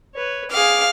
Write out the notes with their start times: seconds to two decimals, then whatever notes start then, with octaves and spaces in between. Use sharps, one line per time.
0.15 B4 C#5
0.51 G#4 F5 D6